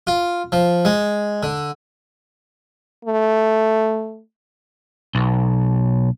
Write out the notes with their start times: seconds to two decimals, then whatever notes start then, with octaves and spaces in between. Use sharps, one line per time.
0.07 F4
0.52 F3
0.85 G#3
1.43 D3
3.05 A3
5.15 B1